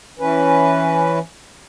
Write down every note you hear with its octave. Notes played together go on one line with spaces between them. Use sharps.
E3 C#4 B4